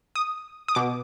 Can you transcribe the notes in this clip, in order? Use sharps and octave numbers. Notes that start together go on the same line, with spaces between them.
D#6
D#6
B2 D6